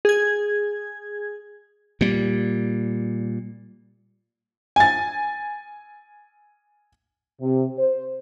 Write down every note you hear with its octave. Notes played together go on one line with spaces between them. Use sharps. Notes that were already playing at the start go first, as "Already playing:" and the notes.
G#4 G#6
A#2 G3
G#5 A6
C3
C5